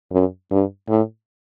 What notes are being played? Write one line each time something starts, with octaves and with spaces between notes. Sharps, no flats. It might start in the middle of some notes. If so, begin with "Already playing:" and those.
F#2
G2
A2